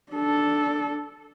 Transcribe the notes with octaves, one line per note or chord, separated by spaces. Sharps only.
D4 A4